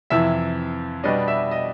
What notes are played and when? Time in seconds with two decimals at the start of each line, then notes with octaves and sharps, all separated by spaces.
0.10 F2 C3 E3 E5
1.04 B2 G3 B3 D4 D#5
1.28 E5
1.51 D#5